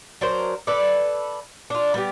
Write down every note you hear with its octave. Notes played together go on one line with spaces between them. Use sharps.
F#3 D4 A#4 C5
A4 B4 D5
D4 F4
G3 B3 G4